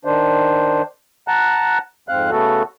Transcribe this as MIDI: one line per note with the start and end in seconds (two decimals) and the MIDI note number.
0.05 0.82 51
0.05 0.82 62
0.05 0.82 72
1.28 1.78 78
1.28 1.78 81
1.28 1.78 82
1.28 1.78 90
2.09 2.30 41
2.09 2.30 44
2.09 2.30 60
2.09 2.30 77
2.09 2.30 90
2.31 2.63 49
2.31 2.63 57
2.31 2.63 59
2.31 2.63 66
2.31 2.63 69